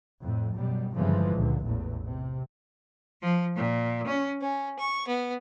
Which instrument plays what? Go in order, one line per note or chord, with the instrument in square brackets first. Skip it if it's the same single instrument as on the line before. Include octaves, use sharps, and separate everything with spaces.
[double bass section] F2 A2
F#2 B2 G3
G1 G2 C#3 E3 F3 G#3
C#2 A#2 D3
A1 E2 A#2
C3
[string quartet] F3
A#2
C#4
C#4
C#6
B3